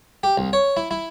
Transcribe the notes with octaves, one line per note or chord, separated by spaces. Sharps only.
G4
C2
C#5
E4
E4